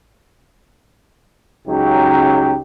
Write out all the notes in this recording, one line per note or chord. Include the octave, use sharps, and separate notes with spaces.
C#2 C#3 F#3 D#4 G4